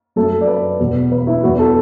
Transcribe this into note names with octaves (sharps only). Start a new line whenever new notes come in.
F#2 F#3 A3 A4
D5
B4
E2 B2 B3
B4
E4
E2 E3 B3 F#4
A4